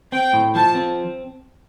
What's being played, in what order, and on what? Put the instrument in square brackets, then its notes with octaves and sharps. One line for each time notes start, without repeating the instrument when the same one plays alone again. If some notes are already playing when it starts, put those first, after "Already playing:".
[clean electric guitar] C4 [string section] G5
[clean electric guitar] A2
[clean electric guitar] F3 [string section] A5
[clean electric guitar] C4